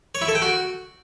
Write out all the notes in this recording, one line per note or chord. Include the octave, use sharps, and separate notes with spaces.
C#5
E4
A4
G5
F#4